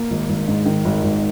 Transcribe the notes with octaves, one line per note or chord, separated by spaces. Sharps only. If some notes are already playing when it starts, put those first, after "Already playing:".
Already playing: A#3
G#1
G#1
G#2
D#3
G#1
G#1